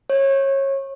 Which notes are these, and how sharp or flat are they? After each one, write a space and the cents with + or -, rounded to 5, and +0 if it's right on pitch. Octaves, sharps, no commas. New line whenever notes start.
C#5 -25